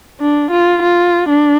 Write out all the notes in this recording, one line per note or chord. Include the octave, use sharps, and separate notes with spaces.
D4
F4
F4
D4